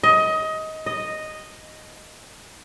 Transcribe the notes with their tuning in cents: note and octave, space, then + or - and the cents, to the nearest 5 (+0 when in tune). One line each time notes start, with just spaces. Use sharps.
D#5 +20
D#5 -5